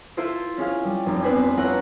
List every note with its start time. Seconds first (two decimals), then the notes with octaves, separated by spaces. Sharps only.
0.17 E4 F4 A4 C5
0.57 C#4 G#4 F5
0.84 G3
1.06 F1
1.22 B3 C4 D4 B4 C5 G#5
1.57 E4 F4 A4 C#5 F#5 A#5